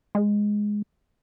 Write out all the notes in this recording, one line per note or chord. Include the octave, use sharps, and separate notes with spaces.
G#3